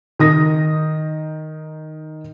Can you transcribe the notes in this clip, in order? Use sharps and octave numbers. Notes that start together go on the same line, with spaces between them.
D#3 D#6 A#6